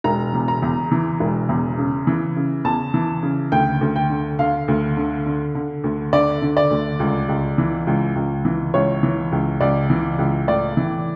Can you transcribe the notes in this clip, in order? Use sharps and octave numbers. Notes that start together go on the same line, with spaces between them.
E1 A#5
E2
A#5
E2
E3
E1
E2
C#3
E3
C#3
E2 A5
E3
C#3
D2 G5
D2
G5
D3
D3 F5
D2
D3
D3
D3
D2
D3 D5
D3
D5
D2
C#2
C#2
E3
C#2
C#2
E3
C#2 C#5
E3
C#2
C#2 D5
E3
C#2
A2 D5
E3